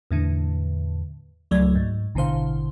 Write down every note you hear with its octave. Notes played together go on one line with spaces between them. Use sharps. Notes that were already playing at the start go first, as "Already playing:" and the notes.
E2 A2 D3
C#2 F#3 A3 D5 G#6
G#2
A1 B2 D3 C5 F5